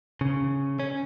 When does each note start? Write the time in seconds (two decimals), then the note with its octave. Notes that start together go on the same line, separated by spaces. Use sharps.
0.21 C#3
0.80 C#4